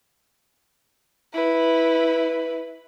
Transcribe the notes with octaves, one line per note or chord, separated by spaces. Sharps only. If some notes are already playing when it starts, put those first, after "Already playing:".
E4 B4